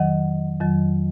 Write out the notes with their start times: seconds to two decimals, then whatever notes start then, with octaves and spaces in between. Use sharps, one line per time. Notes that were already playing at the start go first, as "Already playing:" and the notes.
Already playing: F2 D#3 F#3 D#5 F#5
0.61 F2 D#3 F#3